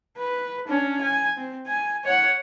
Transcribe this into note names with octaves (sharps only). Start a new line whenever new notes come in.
B4
C#4 D4
G#5
C4
G#5
C#5 F#5